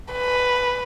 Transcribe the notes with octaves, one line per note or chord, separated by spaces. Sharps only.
B4